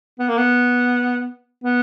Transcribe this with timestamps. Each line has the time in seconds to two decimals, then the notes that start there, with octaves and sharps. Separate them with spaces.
0.19 B3
0.29 A#3
0.37 B3
1.64 B3